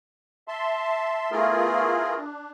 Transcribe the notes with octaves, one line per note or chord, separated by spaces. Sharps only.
E5 A5 C6
A3 B3 E4 F4 G#4 A#4
D4